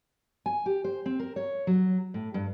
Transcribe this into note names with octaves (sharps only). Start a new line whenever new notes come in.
G#5
G4
C5
C4
A#4
C#5
F#3
A2
G2